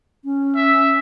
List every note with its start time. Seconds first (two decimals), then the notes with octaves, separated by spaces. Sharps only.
0.24 C#4
0.56 E5